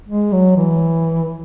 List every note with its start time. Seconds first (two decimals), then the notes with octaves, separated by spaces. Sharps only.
0.08 G#3
0.32 F#3
0.57 E3